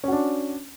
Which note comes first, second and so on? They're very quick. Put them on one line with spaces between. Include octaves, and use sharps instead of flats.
C#4 F#4 D4